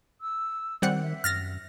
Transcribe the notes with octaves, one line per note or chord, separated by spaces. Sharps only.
E6
D#3 G3 C4 F#5
E5
F#2 F6 A6 A#6